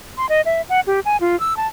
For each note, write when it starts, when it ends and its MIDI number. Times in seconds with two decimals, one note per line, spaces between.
0.17 0.29 84
0.29 0.41 75
0.45 0.62 76
0.69 0.80 78
0.87 1.00 67
1.05 1.17 80
1.21 1.38 65
1.40 1.57 88
1.57 1.67 81